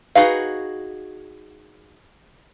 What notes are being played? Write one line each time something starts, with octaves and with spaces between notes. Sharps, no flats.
D#4 F#4 G#4 B4 F5